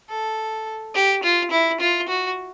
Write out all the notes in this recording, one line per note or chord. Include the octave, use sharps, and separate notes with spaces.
A4
G4
F4
E4
F4
F#4